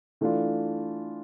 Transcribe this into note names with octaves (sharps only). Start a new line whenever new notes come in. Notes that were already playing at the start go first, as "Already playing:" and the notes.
E3 A3 D4 F4